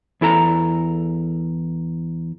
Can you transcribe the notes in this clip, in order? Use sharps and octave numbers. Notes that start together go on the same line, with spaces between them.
E2 E4 A4 A#5